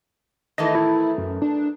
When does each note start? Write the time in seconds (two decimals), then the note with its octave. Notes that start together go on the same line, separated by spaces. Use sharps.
0.58 D#3 E3 A3 D#5
0.75 E4
1.18 F#2
1.42 D4